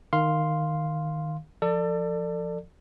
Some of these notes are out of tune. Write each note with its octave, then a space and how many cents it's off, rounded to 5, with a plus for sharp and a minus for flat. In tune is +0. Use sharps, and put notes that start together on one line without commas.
D#3 -10 F5 +0 C6 +0
F3 +0 A4 +30 D5 +15